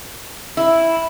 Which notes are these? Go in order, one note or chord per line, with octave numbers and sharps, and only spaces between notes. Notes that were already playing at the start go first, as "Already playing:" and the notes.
E4